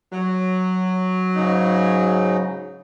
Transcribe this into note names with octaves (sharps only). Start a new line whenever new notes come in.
F#3
G#2 C#3 D#4